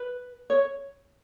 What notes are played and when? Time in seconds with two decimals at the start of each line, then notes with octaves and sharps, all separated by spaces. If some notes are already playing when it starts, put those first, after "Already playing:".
Already playing: B4
0.50 C#5